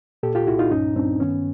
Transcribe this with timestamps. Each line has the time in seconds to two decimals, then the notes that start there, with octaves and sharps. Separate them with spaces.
0.23 A#2 G4 A4
0.35 F4 G4
0.47 C2 E4 F#4
0.59 D#4 F4
0.71 G2 C#4 D#4
0.96 G2 C4 D4
1.20 D#3 B3 C#4